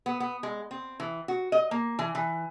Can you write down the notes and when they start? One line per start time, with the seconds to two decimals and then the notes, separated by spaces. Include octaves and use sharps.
0.06 B3
0.20 B3
0.43 G#3
0.71 C4
1.00 E3
1.28 F#4
1.52 D#5
1.71 A#3
1.99 E3
2.15 E3